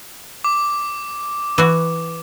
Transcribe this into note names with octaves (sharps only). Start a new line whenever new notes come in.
D6
E3 F#4